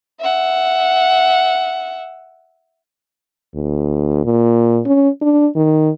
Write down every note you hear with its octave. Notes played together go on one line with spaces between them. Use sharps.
E5 F#5
D2
A#2
C#4
D4
D#3